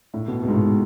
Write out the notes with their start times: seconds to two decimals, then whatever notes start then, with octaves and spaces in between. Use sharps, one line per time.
0.14 A2
0.28 B2
0.43 B2
0.48 G#2
0.53 A2